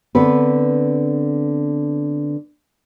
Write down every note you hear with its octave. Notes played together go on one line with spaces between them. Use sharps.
D3 B3 C4 B4